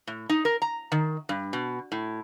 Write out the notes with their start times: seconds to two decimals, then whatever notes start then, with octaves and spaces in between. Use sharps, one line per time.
0.07 A2
0.29 D#4
0.45 A#4
0.62 A#5
0.92 D#3
1.29 G2
1.53 B2
1.92 A2